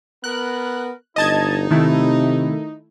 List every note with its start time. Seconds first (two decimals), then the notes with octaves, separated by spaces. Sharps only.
0.24 B3 A#4 F#6
1.16 G1 D#4 D#5 A5 G#6
1.71 C3 D#3 A3 E4